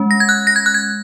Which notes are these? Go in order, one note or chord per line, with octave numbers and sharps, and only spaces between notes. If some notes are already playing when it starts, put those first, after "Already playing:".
Already playing: G#3 C#4
A#6
G#6
F#6
A#6
G#6
F#6
G#6